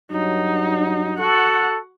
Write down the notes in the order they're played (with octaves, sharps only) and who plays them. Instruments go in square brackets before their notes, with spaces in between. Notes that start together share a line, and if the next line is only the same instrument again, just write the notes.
[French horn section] G2 F#3 [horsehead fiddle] D#4
[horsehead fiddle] F#4 F#5 [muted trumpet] A4